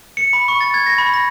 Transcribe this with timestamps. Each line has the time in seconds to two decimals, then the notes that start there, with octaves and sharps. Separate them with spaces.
0.17 C#7
0.33 B5
0.48 C#6
0.61 A6
0.74 G#6
0.86 A#6
0.98 B5
1.14 A#6